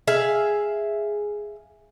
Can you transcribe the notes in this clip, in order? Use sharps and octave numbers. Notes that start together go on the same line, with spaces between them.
G#4 E5 F5